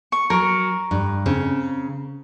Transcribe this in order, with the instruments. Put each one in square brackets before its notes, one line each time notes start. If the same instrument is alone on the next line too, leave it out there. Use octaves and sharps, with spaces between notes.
[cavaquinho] C#6
[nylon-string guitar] F#3 [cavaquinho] A#4 C#6
[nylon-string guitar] G2
C#3 C4